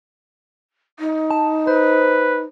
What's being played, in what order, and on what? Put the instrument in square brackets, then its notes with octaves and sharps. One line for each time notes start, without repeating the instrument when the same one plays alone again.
[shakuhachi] D#4
[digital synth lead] A5
[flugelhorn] B4 [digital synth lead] C5